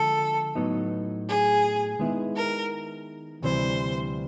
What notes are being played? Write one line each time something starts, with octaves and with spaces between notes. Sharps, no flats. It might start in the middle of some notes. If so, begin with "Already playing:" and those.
Already playing: D3 F3 G#3 A4
A2 F#3 B3 D#4
G#4
D#3 G#3 B3 E4
A#4
D2 C3 E3 G3 C5